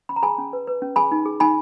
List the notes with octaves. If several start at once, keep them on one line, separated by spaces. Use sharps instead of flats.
C#4 B5
A#5
G#4 G#5 B5
C#4
B4
B4
C#4
G#4 G#5 B5
D#4
G#4
D#4 G#5 B5